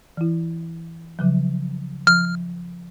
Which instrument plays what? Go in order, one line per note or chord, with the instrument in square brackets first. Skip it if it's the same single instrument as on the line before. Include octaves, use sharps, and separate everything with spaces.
[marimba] E3 E4
C#3 F3 F#3
[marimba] F3 [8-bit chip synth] F6